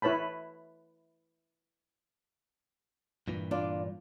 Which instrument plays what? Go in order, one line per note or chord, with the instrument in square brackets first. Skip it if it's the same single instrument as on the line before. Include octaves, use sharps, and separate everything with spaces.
[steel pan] E4 B4 C#5 A5 B5
[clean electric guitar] G2 A#2 E3
[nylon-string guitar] D4 F4 D5